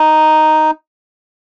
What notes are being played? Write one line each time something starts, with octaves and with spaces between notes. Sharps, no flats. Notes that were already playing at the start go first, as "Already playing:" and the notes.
Already playing: D#4